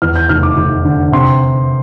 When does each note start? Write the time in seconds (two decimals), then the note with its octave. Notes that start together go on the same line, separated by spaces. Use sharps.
0.02 E2 F6
0.16 G6
0.29 F1 F6
0.43 D6
0.57 F1
0.85 D3
1.12 C3 C6